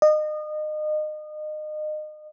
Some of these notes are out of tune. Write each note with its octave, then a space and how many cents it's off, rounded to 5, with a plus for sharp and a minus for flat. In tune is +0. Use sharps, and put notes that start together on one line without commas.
D#5 -30